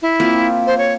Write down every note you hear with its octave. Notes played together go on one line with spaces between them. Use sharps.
E4
A#3 C4 F4
C5
C#5